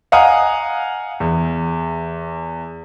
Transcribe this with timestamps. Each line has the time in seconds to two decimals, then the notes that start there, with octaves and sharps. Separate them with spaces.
0.12 D#5 F5 F#5 G#5 A#5 D#6
1.20 E2